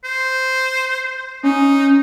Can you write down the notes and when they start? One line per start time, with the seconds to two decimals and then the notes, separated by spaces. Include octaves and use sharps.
0.04 C5
1.43 C#4 D#4